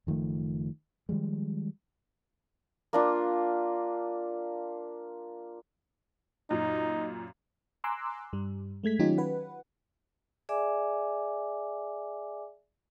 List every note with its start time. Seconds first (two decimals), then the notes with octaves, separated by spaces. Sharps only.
0.07 F#1 D#3 F3 A3
1.09 D#3 F3 G3 G#3
2.93 A#3 D4 F4
6.51 F#2 A#2 D#4
7.84 G#5 A#5 C6 D6 E6 F#6
8.33 G2 G3
8.83 G#3 A3 G#6 B6
8.99 D#3 F#3 C#4 D#4 F4 G4
9.18 B4 F#5
10.49 G#4 D5 E5 G#5 D6